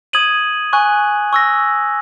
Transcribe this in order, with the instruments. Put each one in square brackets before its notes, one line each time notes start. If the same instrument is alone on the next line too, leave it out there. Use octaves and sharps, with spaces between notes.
[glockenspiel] D#6 G#6 D#7 F#7
G#5 C#6 F#6
C#6 E6 A#6